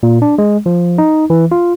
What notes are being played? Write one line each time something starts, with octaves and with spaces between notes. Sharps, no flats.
A#2
D4
G#3
F3
D#4
E3
F4